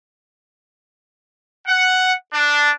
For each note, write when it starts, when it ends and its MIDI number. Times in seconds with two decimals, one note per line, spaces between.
1.68 2.13 78
2.33 2.70 62